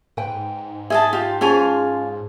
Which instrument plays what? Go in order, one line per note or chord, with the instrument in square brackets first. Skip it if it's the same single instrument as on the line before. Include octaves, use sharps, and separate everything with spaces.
[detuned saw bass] G#2 [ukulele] B4 G5
[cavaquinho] G#4 D#5 A5 [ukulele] E5
[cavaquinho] F4 [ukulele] G4
[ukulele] C#4 C5 [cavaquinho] F4 F5 G#5 [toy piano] G#4 A5